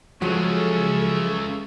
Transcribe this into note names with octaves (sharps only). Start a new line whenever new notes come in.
C#2 C#3 F3 F#3 G#3 A4 E5 C#6